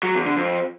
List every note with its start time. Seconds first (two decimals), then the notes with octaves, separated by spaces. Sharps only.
0.03 F#3
0.14 E2
0.26 D3
0.37 F2